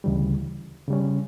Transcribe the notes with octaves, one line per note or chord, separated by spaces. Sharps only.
D2 C#3 E3 G3
C#3 G3 C#4